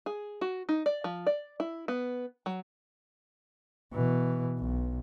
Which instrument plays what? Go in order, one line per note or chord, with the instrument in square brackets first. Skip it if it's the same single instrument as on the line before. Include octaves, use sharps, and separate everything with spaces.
[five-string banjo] G#4
F#4
D#4
D5
F3
D5
E4
B3
F#3
[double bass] B2 E3
B1